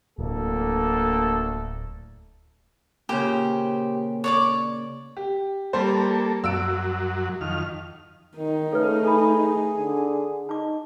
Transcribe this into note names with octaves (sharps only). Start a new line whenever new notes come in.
D1 D2 A#3 A4
A#2 C#3 G4 C5
C#5 D5 D6
G4
G3 A#3 A4 C5
F#2 F#3 E6 D7
F2 D#3 F6
D#3 D#4
C#3 A3 A4 B4
G#4 A4 B5
D3
D#4 A5 D6